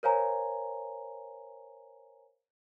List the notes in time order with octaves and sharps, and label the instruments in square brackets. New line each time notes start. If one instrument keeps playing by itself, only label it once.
[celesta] A#4 C5 C#5 F5 G#5 A#5